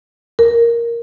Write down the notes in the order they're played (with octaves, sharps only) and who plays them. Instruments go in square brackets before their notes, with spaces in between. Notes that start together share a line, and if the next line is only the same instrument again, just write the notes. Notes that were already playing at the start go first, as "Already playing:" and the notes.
[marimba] A#4